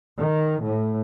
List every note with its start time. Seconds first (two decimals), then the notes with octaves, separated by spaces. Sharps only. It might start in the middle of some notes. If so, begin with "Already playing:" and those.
0.18 D#3
0.63 A2